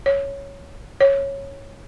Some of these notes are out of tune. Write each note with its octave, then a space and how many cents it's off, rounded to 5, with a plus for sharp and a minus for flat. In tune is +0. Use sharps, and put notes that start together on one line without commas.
C#5 +0
C#5 -10